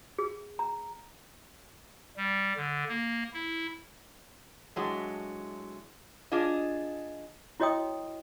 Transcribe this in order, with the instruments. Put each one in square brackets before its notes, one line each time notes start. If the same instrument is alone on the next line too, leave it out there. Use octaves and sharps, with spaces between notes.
[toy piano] G#4
A#5
[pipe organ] G3
D3
A#3
E4
[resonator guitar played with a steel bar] A2 F#3 G#3 D4
D4 F4 G#4 D#5
[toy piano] E4 F#4 C#5 D#5 G5 D#6